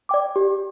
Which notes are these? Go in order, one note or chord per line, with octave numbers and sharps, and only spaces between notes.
D5 G5 D6
G4